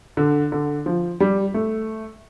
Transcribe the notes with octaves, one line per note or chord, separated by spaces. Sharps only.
D3
D3
F3
G3
A3